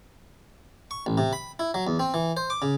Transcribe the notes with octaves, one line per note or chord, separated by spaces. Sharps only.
C#6
A1
C3
B5
E4
F#3
E2
C4
E3
C5
D6
C#3